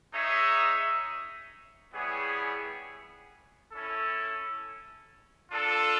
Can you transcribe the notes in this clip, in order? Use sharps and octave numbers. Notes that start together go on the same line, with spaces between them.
D#4 G#4 C#5 E5
G3 B3 E4 G#4 C#5
C#4 E4 A4
D4 F4 A4